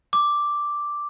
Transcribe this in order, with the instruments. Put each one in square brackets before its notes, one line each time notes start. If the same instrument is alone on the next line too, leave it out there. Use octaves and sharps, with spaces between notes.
[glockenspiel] D6